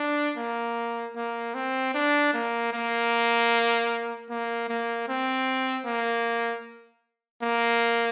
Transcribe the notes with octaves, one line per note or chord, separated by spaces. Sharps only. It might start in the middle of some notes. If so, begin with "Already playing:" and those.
Already playing: D4
A#3
A#3
C4
D4
A#3
A#3
A#3
A#3
C4
A#3
A#3